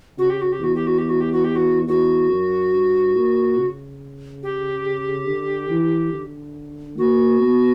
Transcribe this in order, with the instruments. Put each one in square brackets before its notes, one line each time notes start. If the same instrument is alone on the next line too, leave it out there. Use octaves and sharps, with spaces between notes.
[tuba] C#3 [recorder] F#4
[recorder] G4
F#4
G4
[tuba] E2 [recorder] F#4
[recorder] G4
F#4
G4
F#4
G4
F#4
G4
F#4
[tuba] E2 [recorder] F#4
[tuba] F#2
G2
A#2
C#3
[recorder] G4
[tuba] D3
E3
D3
[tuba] A#3 [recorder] F#4
[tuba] B3